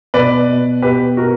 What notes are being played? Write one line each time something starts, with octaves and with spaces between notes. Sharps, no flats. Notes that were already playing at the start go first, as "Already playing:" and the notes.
B2 B4 D5
B2
B2 G4 B4
B2 F#4 A#4